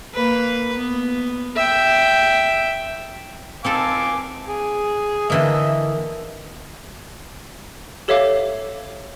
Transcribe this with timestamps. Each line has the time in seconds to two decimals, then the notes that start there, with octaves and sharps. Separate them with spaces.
0.14 A#3 B4
0.77 B3
1.56 E5 G5
3.64 C4 D#4 A4 F5 G#5 D6
4.47 G#4
5.30 D3 E3 A#3 D#5 E5
8.08 G4 A4 C#5 E5 F5 D6